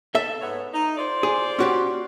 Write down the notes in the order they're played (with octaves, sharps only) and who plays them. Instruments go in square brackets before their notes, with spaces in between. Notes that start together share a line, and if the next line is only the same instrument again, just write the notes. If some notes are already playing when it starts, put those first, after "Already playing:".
[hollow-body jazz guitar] A4 E5
[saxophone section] G#2 B3 C#5
D#4
F4 C5 D5
[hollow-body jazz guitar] G#4
C#4 F#4 G4